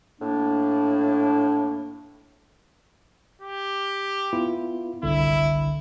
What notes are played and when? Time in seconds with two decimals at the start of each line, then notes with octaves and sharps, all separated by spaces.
0.21 A2 A#3 D4
3.42 G4
4.33 B3 E4 F4
5.03 G1 C2 D3 E4